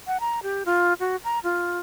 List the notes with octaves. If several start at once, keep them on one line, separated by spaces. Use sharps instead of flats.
F#5
A#5
G4
F4
F#4
A#5
F4